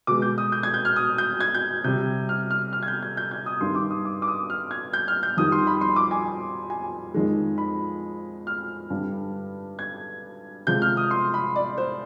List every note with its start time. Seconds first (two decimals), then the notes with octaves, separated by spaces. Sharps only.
0.07 B2 G#3 D6
0.22 G6
0.38 D#6
0.52 G6
0.63 G#6
0.74 G6
0.85 F6
0.96 D#6
1.18 G6
1.40 G#6
1.54 G6
1.84 C3 G3 G6
2.29 F6
2.51 F6
2.73 F6
2.83 G#6
2.88 G6
3.03 G#6
3.17 G6
3.31 G#6
3.46 D#6
3.61 G2 D#3 G3 C6
3.75 D6
3.90 D#6
4.05 D6
4.22 D6
4.28 D#6
4.50 F6
4.71 G#6
4.93 G6
5.08 F6
5.23 G6
5.37 F2 D#3 G3 D#6
5.52 C6
5.67 B5
5.81 C6
5.96 D6
6.11 G#5
6.70 G#5
7.14 F2 D#3 G#3
7.58 B5
8.47 F6
8.90 G2 D3 G3
9.79 G#6
10.67 C3 F3 G#3 G6
10.82 F6
10.97 D#6
11.11 C6
11.34 B5
11.56 D5
11.78 C5